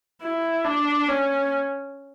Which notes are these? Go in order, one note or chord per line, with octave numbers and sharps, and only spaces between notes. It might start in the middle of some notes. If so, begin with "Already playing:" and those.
E4
D4
C#4